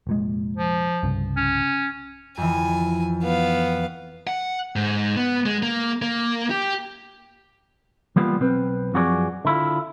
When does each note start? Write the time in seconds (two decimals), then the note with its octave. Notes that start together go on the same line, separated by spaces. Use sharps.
0.07 F1 A#2 G#3
0.57 F3
1.03 C2 G2 C#3
1.36 C#4
2.37 F2 E3 G#5
3.23 B3 F5
4.27 F#5
4.76 G#2
5.17 B3
5.46 G#3
5.63 A#3
6.02 A#3
6.50 G4
8.16 E3 G3 A#3 B3 F4
8.40 B1 C4 B4
8.94 F#2 F3 F#4 G#4 A4 D5
9.45 D3 E4 F4